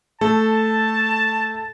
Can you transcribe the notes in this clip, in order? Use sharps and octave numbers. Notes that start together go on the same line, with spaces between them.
A3 A4 A5